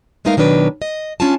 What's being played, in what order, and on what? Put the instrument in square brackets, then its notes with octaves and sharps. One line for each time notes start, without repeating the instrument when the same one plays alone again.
[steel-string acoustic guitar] G#3 A3 B3 D#4 A#4 F5
B2 D#3 F#3 D4 B4
D#5
C#4 D4 F4 G#5 A5